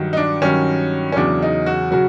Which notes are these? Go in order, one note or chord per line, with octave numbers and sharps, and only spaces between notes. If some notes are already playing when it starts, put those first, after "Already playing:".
Already playing: G2 D#3 F#3
D#4
D4
G2 D#3 F#3 C#4
C#4
E2 C#3 F#3 D4
D#4
F#4
C#3 F#3 F#4